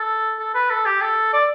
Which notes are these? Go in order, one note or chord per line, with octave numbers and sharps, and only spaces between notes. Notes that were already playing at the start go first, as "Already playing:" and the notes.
Already playing: A4
A4
B4
A4
G4
A4
D5